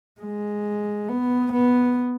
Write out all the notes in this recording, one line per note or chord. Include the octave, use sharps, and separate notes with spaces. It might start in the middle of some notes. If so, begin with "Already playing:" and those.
G#3
B3
B3